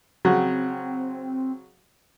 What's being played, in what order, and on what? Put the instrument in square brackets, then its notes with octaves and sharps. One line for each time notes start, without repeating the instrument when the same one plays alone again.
[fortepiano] C#3 F#3 [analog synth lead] C4